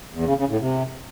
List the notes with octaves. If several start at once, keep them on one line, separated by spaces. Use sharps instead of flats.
E2
C#3
C#3
A2
C3